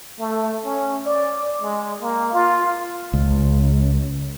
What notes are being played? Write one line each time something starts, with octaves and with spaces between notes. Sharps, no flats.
A3
C#4
D5
G#3
A#3
F4
C#2